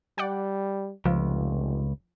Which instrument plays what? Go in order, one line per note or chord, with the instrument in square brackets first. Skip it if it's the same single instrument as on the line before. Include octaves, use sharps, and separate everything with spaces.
[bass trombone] G3 [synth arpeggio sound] D5 F#5 G5
[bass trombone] F1 [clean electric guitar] C#2 [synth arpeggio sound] F3